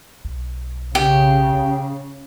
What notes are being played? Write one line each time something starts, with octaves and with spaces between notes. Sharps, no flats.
B1
C#3 G4